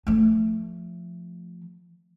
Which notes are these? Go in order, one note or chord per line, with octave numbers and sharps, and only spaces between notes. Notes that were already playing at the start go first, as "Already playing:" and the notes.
F3 A3